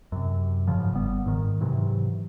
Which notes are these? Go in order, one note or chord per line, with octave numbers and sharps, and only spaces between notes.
F#2 C3
G#2 C#3 F3
G1 G3 B3
G#2 D#3
G#2 C3 E3 F#3